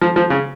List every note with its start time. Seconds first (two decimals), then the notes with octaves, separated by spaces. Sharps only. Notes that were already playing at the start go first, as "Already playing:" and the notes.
0.01 F3
0.16 F3
0.30 C#3